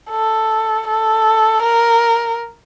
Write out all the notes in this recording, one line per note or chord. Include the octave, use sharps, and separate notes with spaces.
A4
A4
A#4